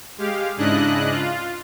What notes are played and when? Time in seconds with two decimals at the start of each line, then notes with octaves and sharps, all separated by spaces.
0.18 G#3 G4 F5
0.57 G#2 C#3 D4 E4 D#5 F#6
1.11 F4